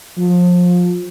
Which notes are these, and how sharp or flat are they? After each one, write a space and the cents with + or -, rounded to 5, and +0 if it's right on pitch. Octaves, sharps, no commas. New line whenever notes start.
F3 +25